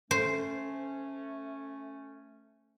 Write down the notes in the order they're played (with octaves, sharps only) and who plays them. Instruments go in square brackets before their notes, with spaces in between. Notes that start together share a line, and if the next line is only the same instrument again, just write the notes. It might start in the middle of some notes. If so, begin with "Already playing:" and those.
[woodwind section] A3 C#4 [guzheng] C5